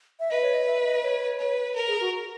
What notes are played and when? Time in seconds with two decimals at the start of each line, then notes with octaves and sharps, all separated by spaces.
0.20 E5
0.30 B4 D#5
0.42 C#5
0.54 D#5
0.66 E5
0.84 D#5
1.03 C#5
1.39 B4
1.76 A#4
1.88 G#4
2.00 F#4